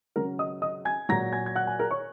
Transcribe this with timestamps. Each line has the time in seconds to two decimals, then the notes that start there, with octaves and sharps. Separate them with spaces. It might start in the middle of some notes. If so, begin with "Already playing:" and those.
0.16 C#3 F#3 A#4 A#5
0.39 D#5 D#6
0.62 D#5 D#6
0.85 G#5 G#6
1.09 A#2 F#3 A#5 A#6
1.33 G#5 G#6
1.46 G#6
1.56 F#5 F#6
1.67 G#5
1.79 A#4 A#5
1.91 C#5 C#6